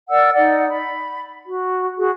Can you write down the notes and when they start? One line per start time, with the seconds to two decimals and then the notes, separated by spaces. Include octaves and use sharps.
0.10 A#4 D5 F#5 E6
0.34 D#4 D5 F#5
0.69 B5
1.46 F#4
1.97 F#4 G#4